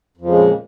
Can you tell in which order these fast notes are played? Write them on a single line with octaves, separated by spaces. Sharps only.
F2 F3 C#3 G#3 A#2